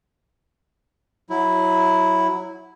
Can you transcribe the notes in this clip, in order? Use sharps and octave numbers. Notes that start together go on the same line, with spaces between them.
F#3 E4